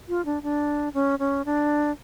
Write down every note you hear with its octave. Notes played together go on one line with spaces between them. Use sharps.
F4
D4
D4
C#4
C#4
D4